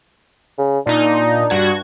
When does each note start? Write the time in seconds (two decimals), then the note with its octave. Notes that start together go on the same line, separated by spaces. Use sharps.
0.58 C#3
0.87 A#2 D4 D#4
1.50 G2 F#4 G#6